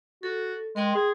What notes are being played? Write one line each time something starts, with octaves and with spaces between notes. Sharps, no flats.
F#4 A4
G#3 A#4 G5 C6
G#4